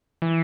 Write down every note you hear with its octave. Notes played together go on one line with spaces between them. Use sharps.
E3